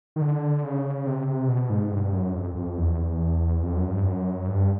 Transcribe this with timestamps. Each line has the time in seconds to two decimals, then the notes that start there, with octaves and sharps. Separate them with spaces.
0.16 D#3
0.21 D3
0.63 C#3
1.07 C3
1.27 C3
1.48 B2
1.70 G#2
1.91 G2
2.13 F#2
2.35 F2
2.55 F2
2.77 E2
3.63 F2
3.76 F#2
3.90 G2
4.05 F#2
4.48 G2